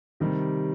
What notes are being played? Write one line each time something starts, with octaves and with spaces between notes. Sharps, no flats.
C3 D#3 G3